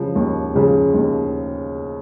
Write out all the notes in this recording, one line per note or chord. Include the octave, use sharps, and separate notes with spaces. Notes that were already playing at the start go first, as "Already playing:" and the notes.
Already playing: C#3 F3 G#3
D#2
C#3 F3 G#3
D#2